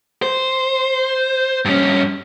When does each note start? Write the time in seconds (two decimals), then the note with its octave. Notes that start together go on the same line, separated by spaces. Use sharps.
0.22 C5
1.65 G2 C#4